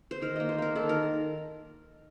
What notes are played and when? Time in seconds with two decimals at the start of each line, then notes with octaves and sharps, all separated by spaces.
0.11 C5
0.21 D#3 A#4
0.36 A#3 D#5
0.49 C5
0.58 A#3 A#4
0.75 D#3 A4
0.89 A#4